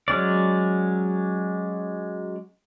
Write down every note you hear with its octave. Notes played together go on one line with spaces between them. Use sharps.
F#3 G#3 C#4 D5